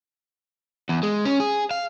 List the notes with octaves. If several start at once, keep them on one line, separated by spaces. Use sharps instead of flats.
E2
G#3
C#4
G#4
F5